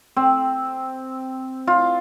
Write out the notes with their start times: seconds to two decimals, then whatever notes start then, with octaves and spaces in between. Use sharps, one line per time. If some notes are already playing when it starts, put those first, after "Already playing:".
0.16 C4
1.67 F4